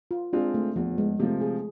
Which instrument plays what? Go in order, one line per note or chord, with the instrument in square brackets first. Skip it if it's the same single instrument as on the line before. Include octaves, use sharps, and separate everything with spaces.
[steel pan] F4
[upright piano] G#3 C4 F4 [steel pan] D4
[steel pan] A3
[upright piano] E2 [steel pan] F3
[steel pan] G#3
[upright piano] C3 F3 [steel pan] A3
[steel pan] G#4